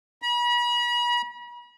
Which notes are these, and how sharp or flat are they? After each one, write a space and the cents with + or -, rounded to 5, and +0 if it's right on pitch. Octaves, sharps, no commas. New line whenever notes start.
B5 -40